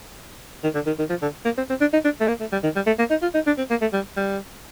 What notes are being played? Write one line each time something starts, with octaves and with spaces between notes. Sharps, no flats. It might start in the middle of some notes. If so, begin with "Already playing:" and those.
D#3
D3
D#3
D#3
F3
D3
A#3
C4
C4
D4
D#4
D4
A3
A#3
A3
G3
D#3
G3
A3
A#3
D#4
F4
D#4
D4
C4
A#3
A3
G3
G3